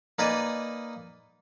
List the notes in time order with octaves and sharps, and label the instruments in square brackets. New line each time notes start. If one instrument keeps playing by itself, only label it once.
[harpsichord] A#3 D#4 B4 D5 D#5 G#5